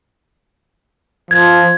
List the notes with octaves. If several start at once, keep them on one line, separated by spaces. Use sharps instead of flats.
F3 G#6